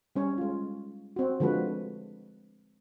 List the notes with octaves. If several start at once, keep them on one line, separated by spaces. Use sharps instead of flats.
G3 C#4 C#5
G#3 F4
C4 F#4
D3 F3 G#3 F#4 B4